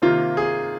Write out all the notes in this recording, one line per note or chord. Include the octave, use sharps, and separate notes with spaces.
C3 D#3 A#3 F4
G#4